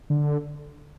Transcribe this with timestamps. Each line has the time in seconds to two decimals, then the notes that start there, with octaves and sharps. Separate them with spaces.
0.10 D3